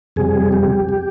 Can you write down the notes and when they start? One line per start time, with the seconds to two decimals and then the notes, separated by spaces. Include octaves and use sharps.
0.16 F2 C3 G3 G#4
0.52 G4
0.89 G4